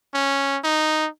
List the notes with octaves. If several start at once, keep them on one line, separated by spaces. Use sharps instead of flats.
C#4
D#4